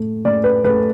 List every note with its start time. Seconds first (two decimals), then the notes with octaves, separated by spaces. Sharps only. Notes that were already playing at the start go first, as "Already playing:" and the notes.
Already playing: A2 A3
0.25 A2 D5
0.44 B4
0.64 A3 B4